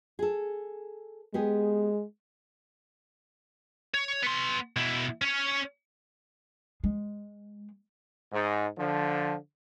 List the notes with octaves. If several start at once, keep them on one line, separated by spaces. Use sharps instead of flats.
G#4 A4
G#3 B3 G4 G#4
C#5
B3 C6
B2 E4
C#4 C#5
G#3
G#2
D3 F3